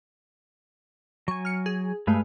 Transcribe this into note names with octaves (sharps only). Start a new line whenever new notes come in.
F#3 G#5 C#6
F6 C#7
G#4
G2 G#3 A3 G#4 B4 F5